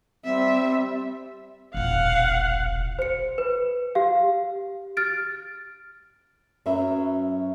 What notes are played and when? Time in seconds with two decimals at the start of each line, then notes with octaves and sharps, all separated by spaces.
0.25 G3 C4 E5
1.74 E1 A#1 F5 F#5
2.99 C5 C#7
3.38 B4
3.95 G4 F5
4.97 F6 A6 D7
6.66 F#2 F#3 C#4 B4 E5